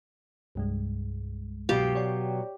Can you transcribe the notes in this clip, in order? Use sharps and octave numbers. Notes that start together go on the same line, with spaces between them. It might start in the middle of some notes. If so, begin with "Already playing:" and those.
C2 G2 G#3
B2 F#3 F4 G4
C#5 D5 G5